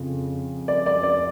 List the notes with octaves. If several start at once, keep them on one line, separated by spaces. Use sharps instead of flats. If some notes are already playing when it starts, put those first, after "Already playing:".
Already playing: F2 C#3
D5
D5
D5